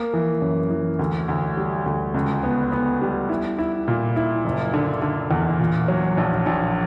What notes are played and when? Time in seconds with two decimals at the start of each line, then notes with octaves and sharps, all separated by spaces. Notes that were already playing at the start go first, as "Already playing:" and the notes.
Already playing: A#3
0.13 E3
0.41 F#2
0.70 E3
0.99 D2
1.28 D2
1.57 G3
1.86 D2
2.14 C#2
2.43 B3
2.72 B3
3.02 G3
3.29 E4
3.58 E4
3.88 A#2
4.16 E4
4.44 F#1
4.74 D3
5.02 D3
5.31 E2
5.59 A#2
5.88 F#3
6.17 A#1
6.46 A#1